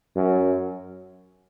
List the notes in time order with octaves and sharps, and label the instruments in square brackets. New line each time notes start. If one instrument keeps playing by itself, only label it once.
[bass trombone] F#2